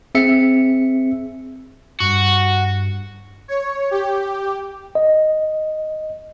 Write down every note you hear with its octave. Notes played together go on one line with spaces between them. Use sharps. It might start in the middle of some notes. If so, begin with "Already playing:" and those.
C4 G#4 E5 C#7
G2 F#4
C#5
G4
D#5